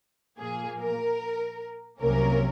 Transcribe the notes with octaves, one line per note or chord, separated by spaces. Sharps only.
A#2 F3 A#3 G#4
A#4
C2 C3 F#3 A#3 C#4 A#4